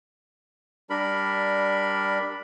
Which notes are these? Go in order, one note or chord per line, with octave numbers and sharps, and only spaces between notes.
G3 D4 A#4 B5